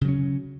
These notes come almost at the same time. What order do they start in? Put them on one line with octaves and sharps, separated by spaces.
C#3 F#3 C#4